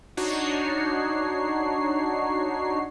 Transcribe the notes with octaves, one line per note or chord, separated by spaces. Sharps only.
D4 D#4 F#4 C#5 C7